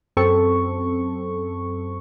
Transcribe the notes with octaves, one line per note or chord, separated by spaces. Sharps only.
F#2 C4 A4 C#6